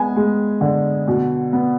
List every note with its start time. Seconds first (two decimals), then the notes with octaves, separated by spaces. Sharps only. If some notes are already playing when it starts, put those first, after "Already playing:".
Already playing: G#3 B3 G#5
0.16 G#3
0.61 D3
1.08 B2
1.53 B3